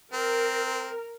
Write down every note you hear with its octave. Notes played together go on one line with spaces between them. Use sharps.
C4 A#4